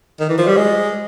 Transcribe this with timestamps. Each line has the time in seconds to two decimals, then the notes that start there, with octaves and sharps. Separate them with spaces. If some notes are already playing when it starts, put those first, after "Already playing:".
0.20 D#3
0.29 E3
0.38 F3
0.47 G3
0.57 G#3